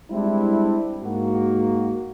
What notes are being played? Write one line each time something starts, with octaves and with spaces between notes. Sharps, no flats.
G3 G#3 C4 D4 E4
G#2 A#3 F#4